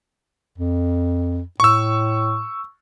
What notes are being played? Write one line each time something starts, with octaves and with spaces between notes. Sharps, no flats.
F2
A2 C#6 E6